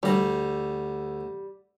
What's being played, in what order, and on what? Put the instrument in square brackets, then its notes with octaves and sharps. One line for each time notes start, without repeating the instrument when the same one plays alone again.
[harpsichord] D2 A#5 [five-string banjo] G3